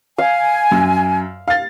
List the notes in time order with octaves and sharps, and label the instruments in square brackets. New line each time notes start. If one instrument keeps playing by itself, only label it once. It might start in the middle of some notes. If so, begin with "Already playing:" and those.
[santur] F5 [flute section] G#5
[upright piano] F#2
F5 A6